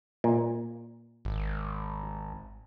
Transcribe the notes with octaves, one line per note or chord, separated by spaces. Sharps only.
A#2
G#1